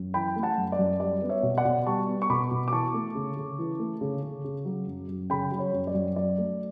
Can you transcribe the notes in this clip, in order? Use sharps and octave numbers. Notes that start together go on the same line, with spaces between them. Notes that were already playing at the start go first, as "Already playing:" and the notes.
Already playing: F#2
E3 G5 B5
A3
F#5 A5
F#2
D5
F#2
G3 D5
B3
C#5 E5
B2
D5 F#5
B2
G3 A5 C#6
B3
C#6
B2 B5 D6
B2
D6
E3 A5 C#6
A3
C#3
C#3
E3
A3
C#3
C#3
C#3
F#3
F#2
F#2
C#3 G5 B5
F#3
C#5
F#2
D5
F#2
F#3 D5
A3